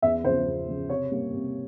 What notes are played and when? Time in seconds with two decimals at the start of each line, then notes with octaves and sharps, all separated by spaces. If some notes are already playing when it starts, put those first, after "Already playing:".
0.02 E2 E5
0.24 C#3 F3 C5
0.47 E2
0.68 C#3 F3
0.89 C3 C#5
1.11 G3 A#3
1.33 C3